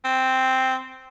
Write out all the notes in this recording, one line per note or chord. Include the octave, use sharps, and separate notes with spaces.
C4